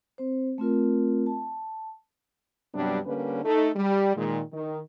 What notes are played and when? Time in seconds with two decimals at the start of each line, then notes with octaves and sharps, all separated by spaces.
0.18 C4 C5
0.58 A3 C4 F4 A#4
1.26 A5
2.74 G2 C3 F#3 G3 B3 D4
3.06 D3 G3 A#3 C#4 B4
3.44 A3 D#4 A4
3.76 G3
4.16 A#2 D#3 G#3
4.52 D#3